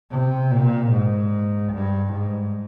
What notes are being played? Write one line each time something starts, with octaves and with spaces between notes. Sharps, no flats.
C3
A#2
G#2
G2
G#2